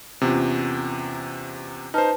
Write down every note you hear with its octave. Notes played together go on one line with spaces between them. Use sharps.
E2 C3 C#4 F4
D#4 B4 C5 A5 F6